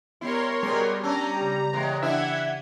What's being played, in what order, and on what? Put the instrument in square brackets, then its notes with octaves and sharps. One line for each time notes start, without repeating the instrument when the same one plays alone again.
[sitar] G3 E4 [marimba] B3 [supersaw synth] A#4 C#5 C6
[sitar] B2 G#4 [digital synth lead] G3
[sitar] C#4 D4 [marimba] A5 E6 [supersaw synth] A#5
[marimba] C#3 G4
[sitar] E2 A2 G#3
[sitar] E3 D4 [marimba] E4 [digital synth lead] E5 [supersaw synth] F#5 G#6